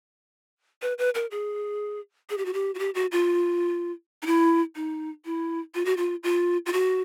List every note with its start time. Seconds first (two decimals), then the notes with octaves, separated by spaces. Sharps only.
0.82 B4
0.98 B4
1.15 A#4
1.31 G#4
2.30 G#4
2.38 G4
2.45 F#4
2.53 G4
2.75 F#4
2.79 G4
2.95 F#4
3.12 F4
4.22 D#4
4.26 E4
4.75 D#4
5.25 E4
5.75 F4
5.85 F#4
5.97 F4
6.23 F4
6.66 F4
6.73 F#4